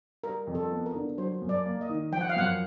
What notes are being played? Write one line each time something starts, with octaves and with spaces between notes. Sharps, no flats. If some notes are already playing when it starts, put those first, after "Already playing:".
G3 A#4
F2
A4
B3
A#4
D3
F#3 C5
F#2
D5
A#3
D#5
D#3
F3 G5
F#5
F5
F#2 F#5